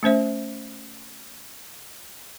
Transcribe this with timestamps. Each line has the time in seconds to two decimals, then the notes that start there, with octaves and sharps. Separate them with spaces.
0.03 A3 C#4 C5 E5